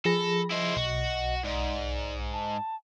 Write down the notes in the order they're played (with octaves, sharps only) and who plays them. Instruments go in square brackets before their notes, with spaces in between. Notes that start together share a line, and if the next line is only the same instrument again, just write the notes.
[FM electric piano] F3 G#4 A#6 [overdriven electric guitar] A4 [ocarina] B5
[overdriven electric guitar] E4 C5 [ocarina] D#5
[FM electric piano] B1 [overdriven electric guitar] F#4
[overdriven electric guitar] G#2 [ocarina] D5
[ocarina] A5